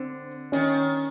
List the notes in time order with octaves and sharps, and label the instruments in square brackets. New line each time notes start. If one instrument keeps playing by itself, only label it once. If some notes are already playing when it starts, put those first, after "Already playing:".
Already playing: [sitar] D3 [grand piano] C4
[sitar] D#3 [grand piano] C#4